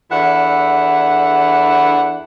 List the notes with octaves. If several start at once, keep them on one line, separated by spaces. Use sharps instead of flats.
E2 D4 E4 A4 F#5